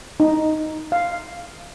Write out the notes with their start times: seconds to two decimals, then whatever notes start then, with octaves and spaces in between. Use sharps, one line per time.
0.20 D#4
0.92 F5